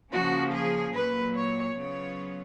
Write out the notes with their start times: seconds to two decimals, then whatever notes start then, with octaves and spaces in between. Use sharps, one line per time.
0.11 C#3 F3 A#3 C#4 F#4
0.52 G#4
0.94 A#2 F#3 A#3 B4
1.35 C#5
1.77 C#3 F#3 B3 F4 C#5